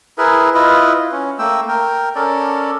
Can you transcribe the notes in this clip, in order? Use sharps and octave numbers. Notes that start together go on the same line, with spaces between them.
E4 G#4 A#4 B4
E4 F4 B4 D#5
C#4
A3 A#3 G5 E6
A#4 G5
C#4 A4 A#4 D5